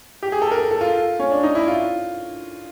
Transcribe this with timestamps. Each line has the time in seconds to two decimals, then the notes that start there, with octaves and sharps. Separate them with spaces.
0.23 G4
0.32 G#4
0.42 A4
0.51 A#4
0.71 A4
0.81 F4
1.19 C#4
1.31 D4
1.43 D#4
1.55 E4
1.68 F4